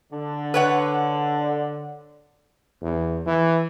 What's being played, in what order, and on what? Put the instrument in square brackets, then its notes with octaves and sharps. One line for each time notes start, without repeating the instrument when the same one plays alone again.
[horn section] D3
[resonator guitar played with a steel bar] B4 C#5 F#5
[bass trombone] E2
E3